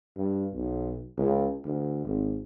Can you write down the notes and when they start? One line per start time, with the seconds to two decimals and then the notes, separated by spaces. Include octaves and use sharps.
0.16 G2
0.54 B1
1.18 C#2
1.65 D2
2.05 G#1